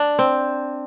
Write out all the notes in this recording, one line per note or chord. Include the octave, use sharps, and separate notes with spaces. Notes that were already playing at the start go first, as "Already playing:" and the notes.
Already playing: D4
C4